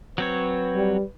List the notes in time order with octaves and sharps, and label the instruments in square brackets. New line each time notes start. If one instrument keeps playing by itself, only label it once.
[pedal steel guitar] F#3 C4 C#5 [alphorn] B4
[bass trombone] G3